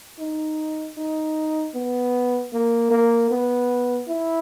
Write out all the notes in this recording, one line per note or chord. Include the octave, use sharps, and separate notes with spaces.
D#4
D#4
B3
A#3
A#3
B3
E4